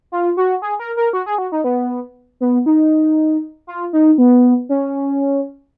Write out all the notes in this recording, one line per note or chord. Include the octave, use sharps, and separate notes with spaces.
F4
F#4
G#4
A#4
A#4
F#4
G#4
F#4
D#4
B3
B3
D#4
F4
D#4
B3
C#4